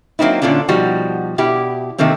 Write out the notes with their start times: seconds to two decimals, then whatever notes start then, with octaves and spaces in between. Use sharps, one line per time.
0.19 F#3 A#3 C4 D#4 E4
0.42 A#2 D3 C#4 D4 F4
0.69 B2 F3 G3 D#4 F#4
1.38 B2 E4 G4
1.98 C3 D#3 A3 A#3 C4